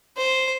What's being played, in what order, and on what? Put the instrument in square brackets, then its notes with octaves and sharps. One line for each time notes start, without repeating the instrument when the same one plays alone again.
[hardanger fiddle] C5